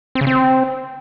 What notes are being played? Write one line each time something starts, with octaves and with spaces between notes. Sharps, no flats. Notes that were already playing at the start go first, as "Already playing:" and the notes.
C4
C#3
C4